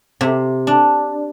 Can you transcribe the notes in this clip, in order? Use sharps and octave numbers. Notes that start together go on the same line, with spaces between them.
C3
D4